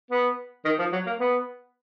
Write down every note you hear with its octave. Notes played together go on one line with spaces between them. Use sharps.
B3
D#3
F3
F#3
A#3
B3